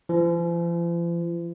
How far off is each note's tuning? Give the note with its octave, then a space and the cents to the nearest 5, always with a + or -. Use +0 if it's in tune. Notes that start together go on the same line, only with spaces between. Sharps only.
F3 -45